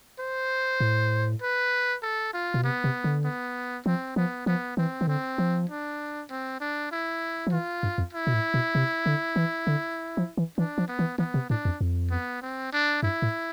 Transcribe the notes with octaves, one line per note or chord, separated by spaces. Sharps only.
C5
A2
B4
A4
F4
B2
C3 B3
C3
D3
B3
F3 C4
F3 B3
F3 B3
E3 C4
E3
D3 C4
F3
D4
C4
D4
E4
F3
E3 F4
G2
F2
E4
B2
A2
B2
C3
D3
E3
D3
F3
E3
E3 D4
F3
B3
E3
E3 B3
C3
A2 D4
F2
F2
B3
C4
D4
G2 E4
A2